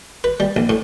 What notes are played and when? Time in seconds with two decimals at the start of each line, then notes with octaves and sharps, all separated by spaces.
0.24 B4
0.40 G3
0.56 A#1
0.69 A2